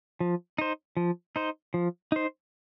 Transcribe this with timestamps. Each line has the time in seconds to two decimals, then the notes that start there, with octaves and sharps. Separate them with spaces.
0.20 F3
0.58 D#4 C5
0.97 F3
1.36 D#4 C5
1.74 F3
2.12 D#4 C5